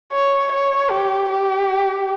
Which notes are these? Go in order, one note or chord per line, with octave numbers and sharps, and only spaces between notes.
C#5
C#5
G4
G4